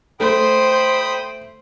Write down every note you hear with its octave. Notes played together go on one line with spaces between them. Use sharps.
A3 C5 G5 B5 D#6